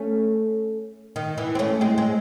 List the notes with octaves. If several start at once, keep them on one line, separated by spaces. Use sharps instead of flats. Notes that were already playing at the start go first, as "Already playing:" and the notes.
Already playing: A3 C#4
D#3
E3
C4
A3 C#4
G#3 C4
G#3 C4